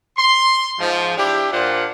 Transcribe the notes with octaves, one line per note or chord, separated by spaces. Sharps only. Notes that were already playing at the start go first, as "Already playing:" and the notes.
C6
G#2 F3
D4 E4 G4
A#2 D4 F4 C5 F#5